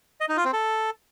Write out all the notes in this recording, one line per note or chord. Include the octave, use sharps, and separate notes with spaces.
D#5
D#4
F4
C4
A4